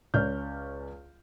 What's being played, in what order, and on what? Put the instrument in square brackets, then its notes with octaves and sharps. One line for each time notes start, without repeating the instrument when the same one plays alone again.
[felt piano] C#2 C#4 D5 F6 G6